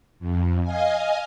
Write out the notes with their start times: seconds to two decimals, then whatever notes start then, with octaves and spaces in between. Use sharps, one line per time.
0.19 F2
0.62 D#5 F5 G#5